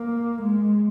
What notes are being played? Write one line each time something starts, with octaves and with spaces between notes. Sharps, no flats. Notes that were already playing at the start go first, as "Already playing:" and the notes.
Already playing: A#3
G#3